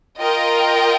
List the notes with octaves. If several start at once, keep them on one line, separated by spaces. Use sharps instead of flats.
F4 A#4 D#5 G5